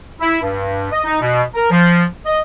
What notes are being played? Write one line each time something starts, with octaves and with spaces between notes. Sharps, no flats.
E4
G2
D#5
D#4
B2
A#4
F3
D#5